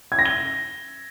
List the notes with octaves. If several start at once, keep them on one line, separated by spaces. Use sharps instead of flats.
G#6
A#6
G7